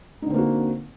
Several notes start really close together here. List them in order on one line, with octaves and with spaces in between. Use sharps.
D#4 D3 C4 A#3 F#4